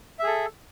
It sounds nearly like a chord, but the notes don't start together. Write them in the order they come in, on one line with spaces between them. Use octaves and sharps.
E5 G#4 A4